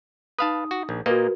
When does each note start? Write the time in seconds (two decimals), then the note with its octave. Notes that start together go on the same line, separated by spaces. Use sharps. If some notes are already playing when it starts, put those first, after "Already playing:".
0.39 D#4 B4 F5 A5 D#6
0.71 F#4
0.89 A#1
1.06 A#2 A#3 F#4 A#4 B4 D#5